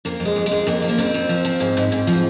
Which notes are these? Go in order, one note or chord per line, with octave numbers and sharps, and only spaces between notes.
F2 A#3
F2
G#3
F2
G#3
F2
F2 A#3
F3
A#3
F2 C4
F2
F3
F3
G#2
G#2
G#2
F3